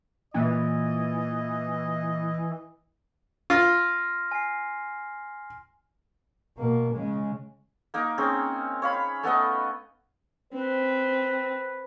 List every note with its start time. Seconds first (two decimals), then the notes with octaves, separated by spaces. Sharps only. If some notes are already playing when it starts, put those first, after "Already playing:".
0.34 A#2 E3 D#5
3.50 F4 C6 F6 A#6
4.31 G#5 C7
6.57 B2 A#3
6.92 C#3 G#3
7.94 A#3 D#4 A#4
8.18 C4 C#4 G#4
8.82 C#5 F5 B5
9.23 A3 B3 B4 D#5
10.53 C4 B4